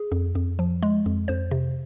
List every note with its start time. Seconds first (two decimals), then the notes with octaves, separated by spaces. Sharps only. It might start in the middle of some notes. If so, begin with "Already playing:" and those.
Already playing: G#4
0.12 F2
0.35 F2
0.59 F3
0.82 G#3
1.06 F2
1.28 F2 C5
1.51 C3